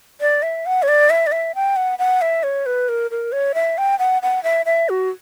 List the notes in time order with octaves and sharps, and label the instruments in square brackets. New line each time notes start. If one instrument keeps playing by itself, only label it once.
[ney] D5
E5
F#5
C#5
D5
E5
D5
E5
G5
F#5
F#5
E5
C#5
B4
A#4
A#4
C#5
E5
G5
F#5
F#5
E5
E5
F#4